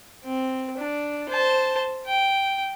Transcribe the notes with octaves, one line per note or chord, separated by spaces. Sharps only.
C4
D4
C5 A5
G5